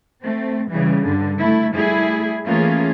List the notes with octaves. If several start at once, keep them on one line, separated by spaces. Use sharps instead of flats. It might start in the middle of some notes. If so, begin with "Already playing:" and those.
A3 C4
C#3 E3 G3
G2 D3
A3 E4
G3 A3 E4 G#4
E3 A3 A#3 C#4 F4 G#4